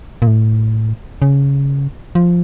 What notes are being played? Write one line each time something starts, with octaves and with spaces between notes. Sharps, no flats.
A#2
A2
C#3
F3